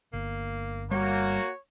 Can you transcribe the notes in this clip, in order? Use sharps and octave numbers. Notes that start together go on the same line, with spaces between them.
G1 A#3
G3 A#3 F#4 C#5